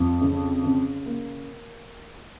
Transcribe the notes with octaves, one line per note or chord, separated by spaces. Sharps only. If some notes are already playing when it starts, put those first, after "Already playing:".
Already playing: F2 F3
C#3
C#3
A#3